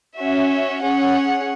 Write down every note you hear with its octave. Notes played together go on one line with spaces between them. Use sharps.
C#4 F#4 E5
C#4 G#4 F#5